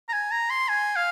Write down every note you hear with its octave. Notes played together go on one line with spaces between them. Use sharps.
A#5
G#5
A#5
C6
G#5
F5